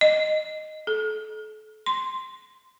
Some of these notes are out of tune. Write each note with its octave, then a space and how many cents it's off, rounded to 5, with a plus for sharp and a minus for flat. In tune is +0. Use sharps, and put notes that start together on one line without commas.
D#5 -5
A4 -35
C6 -5